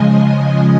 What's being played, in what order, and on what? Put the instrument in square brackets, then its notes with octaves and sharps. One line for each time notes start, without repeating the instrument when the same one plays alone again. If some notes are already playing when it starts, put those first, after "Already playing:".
Already playing: [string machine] C#3 F3 G#3 D#5 G#5